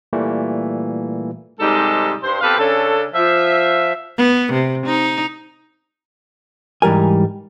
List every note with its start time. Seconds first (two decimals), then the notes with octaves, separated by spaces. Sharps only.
0.13 A#2 E3 G3 A3 A#3
1.60 G#2 C3 G3 G#3 D#4 A4
2.23 G2 C5
2.41 B3 C4 G4 A4 B4 F5
2.58 C#3 C#4 D4 A4
3.14 F3 E5
4.18 B3
4.52 C3
4.86 D#4
6.82 G#2 E3 G3 A#4 G#5